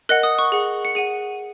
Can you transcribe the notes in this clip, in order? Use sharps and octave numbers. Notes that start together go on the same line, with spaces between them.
A#4 D#5 F#5 F#6
D#6
C#6
G#4 F#5
C#7
G#4 F#5 D#7